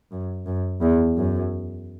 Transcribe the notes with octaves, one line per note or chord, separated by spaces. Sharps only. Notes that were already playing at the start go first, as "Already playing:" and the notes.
F#2
F#2
E2
F#2